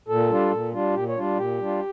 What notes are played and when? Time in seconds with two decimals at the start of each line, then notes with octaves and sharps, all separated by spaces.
0.08 A#2 A4
0.30 G3 D4 F4
0.51 A#2
0.73 G3 D4 F4
0.94 A#2 G4
1.09 C#5
1.16 G3 D4 F4
1.37 A#2 G4
1.59 G3 D4 F4